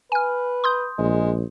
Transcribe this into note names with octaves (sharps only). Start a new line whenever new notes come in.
B4 G#5 F6
C6 D#6 G6
A#1 G#3